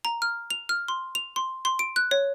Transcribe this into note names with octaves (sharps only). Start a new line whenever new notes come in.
A#5
F6
F7
F6
C6
F7
C6
C6
D7
F#6
C#5